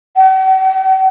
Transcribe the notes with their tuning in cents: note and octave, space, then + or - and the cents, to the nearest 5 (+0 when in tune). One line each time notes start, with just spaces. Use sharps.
F#5 +45